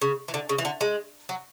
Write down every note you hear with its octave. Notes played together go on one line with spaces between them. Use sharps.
C#3
E3
D3
C#3
E3
D3
G#3
F#3